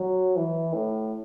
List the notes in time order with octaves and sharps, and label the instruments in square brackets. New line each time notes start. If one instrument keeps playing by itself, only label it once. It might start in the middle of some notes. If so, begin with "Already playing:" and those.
Already playing: [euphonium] F#3
E3
A2